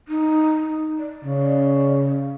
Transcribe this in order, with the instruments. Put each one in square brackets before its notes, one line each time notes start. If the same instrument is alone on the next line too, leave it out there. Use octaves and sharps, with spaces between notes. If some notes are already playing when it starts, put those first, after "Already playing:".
[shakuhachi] D#4
D5
[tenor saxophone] C#3